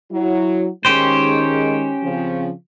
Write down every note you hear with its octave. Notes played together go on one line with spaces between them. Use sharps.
F#3 E4
D#3 G#3 C#4 G4 C5
C#3 F3 C4